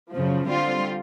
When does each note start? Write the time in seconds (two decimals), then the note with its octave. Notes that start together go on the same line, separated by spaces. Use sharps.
0.12 F#2 C#3 F3
0.47 D3 G3 C4 F4